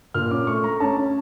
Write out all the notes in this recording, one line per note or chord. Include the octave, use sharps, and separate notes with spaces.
A#2 F6
C#4 D6
A3 C#6
A3 A#5
C#4 A5
C#4